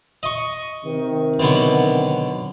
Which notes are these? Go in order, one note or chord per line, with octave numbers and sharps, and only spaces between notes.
D#5 C#6
C3 D#3
B2 D3 F#3